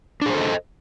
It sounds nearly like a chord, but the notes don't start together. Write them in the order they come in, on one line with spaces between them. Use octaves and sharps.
D4 G#4 C5 A4 D#5